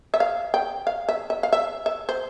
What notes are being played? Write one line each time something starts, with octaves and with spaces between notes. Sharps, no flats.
E5
F5
G5
F5
E5
E5
F5
E5
E5
C5